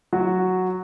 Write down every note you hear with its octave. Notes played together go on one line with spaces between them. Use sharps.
F#3 F#4